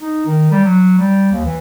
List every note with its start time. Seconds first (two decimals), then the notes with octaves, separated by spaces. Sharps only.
0.01 D#4
0.26 D#3
0.51 G3
0.65 F#3
0.98 G3
1.32 D#2
1.46 E3